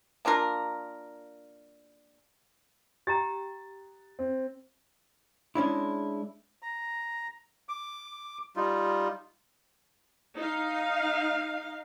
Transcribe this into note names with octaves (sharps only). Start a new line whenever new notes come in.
A#3 D4 F4 A#4
G4 G5 A#5 A6
C4
G#3 C#4 D4 E4
A#5
D6
G3 D#4 F4
D#4 F5